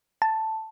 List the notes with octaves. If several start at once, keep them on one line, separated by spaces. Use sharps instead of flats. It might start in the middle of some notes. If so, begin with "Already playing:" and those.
A5